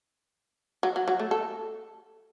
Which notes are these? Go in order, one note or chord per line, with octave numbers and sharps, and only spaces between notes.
F#3
F#3
F#3
A3
A4